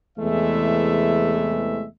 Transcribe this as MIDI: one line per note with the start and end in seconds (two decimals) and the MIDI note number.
0.18 1.84 40
0.18 1.84 48
0.18 1.84 52
0.18 1.84 56
0.18 1.84 57
0.18 1.84 76